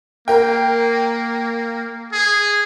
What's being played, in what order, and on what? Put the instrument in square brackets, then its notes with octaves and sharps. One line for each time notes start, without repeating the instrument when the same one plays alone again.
[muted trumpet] A#3 [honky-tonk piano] A#4 G5
[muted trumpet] G#4